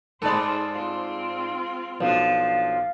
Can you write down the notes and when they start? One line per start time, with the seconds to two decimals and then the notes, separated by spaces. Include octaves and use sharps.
0.22 G#2 G#3 A4 C5 D5
0.71 C4 F4
2.01 B1 F3 D4 F5